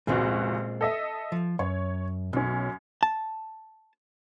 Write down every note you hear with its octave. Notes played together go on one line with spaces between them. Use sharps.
F1 C#2 A#2 G#3 C4 F#4
A4 D#5 E5
F3
F#2 C#5
B1 F#2 C#4
A5